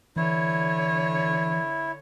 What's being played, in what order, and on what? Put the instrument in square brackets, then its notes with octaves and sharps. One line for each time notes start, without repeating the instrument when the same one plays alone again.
[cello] D3 C#5 [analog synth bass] E3 [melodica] E4